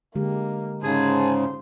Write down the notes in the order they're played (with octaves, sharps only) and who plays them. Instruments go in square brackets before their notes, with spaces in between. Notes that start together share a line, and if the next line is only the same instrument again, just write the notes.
[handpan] D3 G#3 G4 [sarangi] A#3
[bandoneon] G#2 C#3 [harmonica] G#4 G#5 A5 [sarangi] C5